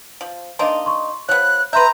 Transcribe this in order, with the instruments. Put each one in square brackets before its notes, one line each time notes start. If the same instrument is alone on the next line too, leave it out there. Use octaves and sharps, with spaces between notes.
[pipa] F3
[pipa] A#3 D4 D#4 [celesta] D#5 F5 C6
[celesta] C6 C#6
[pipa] F3 B3 [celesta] C#5 [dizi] F#6
[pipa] B4 E5 [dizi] A#5 [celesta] C6 G6